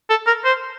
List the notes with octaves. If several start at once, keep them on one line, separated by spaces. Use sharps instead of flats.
A4
A#4
C5